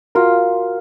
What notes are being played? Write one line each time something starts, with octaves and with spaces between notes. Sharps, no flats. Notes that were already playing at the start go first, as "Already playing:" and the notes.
F4 F#4 A#4